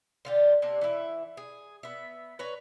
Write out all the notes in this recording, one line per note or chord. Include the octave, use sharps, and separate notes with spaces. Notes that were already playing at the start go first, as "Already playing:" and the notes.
D3 F4 G4
C3 A#3 D4
E3 E4
G#4
B3 E5
B4 C#5 A#5